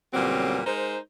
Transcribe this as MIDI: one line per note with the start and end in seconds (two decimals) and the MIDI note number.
0.14 0.60 40
0.14 0.60 46
0.14 0.60 49
0.14 0.60 54
0.14 0.60 55
0.14 0.60 60
0.65 0.97 56
0.65 0.97 63
0.65 0.97 70
0.65 0.97 72